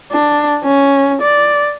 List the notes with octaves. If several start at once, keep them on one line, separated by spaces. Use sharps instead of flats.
D4
C#4
D5